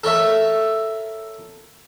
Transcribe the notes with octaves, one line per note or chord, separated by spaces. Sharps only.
A4 A#4 C#5 E5